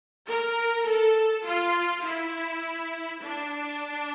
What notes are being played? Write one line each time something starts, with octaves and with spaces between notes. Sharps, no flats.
A#4
A4
F4
E4
D4